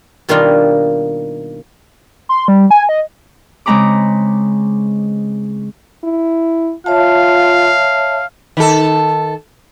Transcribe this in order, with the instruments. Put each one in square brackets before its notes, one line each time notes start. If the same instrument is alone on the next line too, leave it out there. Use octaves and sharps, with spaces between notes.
[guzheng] B2 D#3 G3 A#3 D4 F4
[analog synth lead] C6
G3
G#5
D#5
[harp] C#3 G#3 C4 A#5 B5 D6
[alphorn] E4
[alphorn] F4 [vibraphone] C#5 E5 A5 [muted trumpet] F5
[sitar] D#3 A4